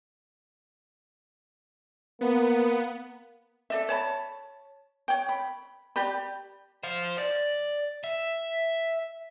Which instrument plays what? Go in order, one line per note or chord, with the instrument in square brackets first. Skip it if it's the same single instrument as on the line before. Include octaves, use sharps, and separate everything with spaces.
[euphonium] A#3 [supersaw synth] B3
[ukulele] A4 D5 E5
C#5 A5 B5
C#5 G5
B5
G4 D5 B5
[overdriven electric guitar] C5 F5
D5
E5